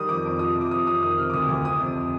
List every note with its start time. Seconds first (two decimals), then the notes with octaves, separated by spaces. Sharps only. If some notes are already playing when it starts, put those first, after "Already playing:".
Already playing: D#3 G3 D#6
0.09 F2 D6
0.25 F2
0.39 F3 D#6
0.56 C3
0.61 D6
0.71 F2 D#6
0.86 F2 D#6
1.03 D#3 D#6
1.18 C3 F6
1.30 D6
1.34 D2 D#6
1.48 D2 D6
1.64 C3 D#6
1.80 F2